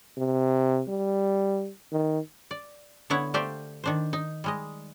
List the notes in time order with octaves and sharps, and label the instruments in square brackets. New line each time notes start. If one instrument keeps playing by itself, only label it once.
[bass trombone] C3
G3
D#3
[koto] D5
D3 B3 E4 C#5 F#5
A3 G4 C5 D5 F5 G5
D#3 D4 C5
D#4
G3 G#3 D#5